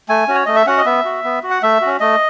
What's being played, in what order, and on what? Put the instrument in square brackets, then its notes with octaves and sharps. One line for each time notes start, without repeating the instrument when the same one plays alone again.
[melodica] A3 G#5
C#4 F#4
C#5
A3 D#5
E5
C#4 F#4 F#5
D#5
B3 E5
F#4
B3
F#4
F#5
A3 E5
C#4 F#4
A3 D#5